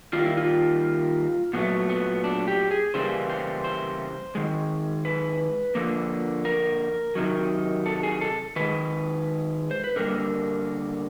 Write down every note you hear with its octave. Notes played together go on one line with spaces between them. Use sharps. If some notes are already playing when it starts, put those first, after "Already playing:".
D#3 G3 A#3 F4
E4
F4
A#2 F#3 A3 B3
B3
D4
G4
G#4
C#3 E3 G3 A#3 C5
C5
C5
D#3 G#3
B4
D3 F3 A#3
A#4
C3 D#3 F#3
A4
G#4
A4
D#3 G#3 B4
C5
B4
D3 G3 A#3 A#4